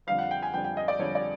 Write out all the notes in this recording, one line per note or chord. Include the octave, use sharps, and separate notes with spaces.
F2 D3 G3 F5
F#5
G5
G#5
F2 D3 G3 G5
G5
D#5
D5
F2 D3 G3 C#5
D5